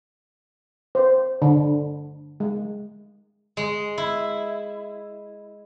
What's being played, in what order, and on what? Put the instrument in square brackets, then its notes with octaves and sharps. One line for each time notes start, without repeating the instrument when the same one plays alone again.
[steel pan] C5
D3
G#3
[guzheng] G#3
E4